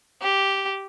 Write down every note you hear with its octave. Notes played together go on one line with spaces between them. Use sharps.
G4